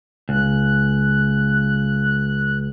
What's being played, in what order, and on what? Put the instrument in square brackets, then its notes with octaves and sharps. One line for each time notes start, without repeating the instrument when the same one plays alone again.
[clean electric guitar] C#2 [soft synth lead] F#6